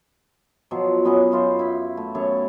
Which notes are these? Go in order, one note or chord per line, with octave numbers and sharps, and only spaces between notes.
B2 F3 F#3
F#3 B3 C#4 D#5
F#2 F4 C5
E4 B5
A3
F#2 B3 A4 C#5